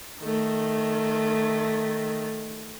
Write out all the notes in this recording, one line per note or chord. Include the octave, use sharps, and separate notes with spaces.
D#3 A3